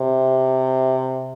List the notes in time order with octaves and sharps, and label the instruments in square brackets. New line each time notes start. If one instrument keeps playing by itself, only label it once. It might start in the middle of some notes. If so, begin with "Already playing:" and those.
Already playing: [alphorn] C3